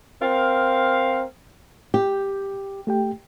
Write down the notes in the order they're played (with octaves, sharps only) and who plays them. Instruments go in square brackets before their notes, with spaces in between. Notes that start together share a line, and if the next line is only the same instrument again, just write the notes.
[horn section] C4 A#4 F5
[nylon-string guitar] G4 [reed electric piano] G6
[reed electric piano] A3 G4 G5